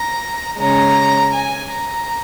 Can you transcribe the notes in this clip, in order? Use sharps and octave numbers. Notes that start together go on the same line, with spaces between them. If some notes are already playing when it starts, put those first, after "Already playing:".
Already playing: A#5
C#3 G#3 C#4 A#5
G#5
A#5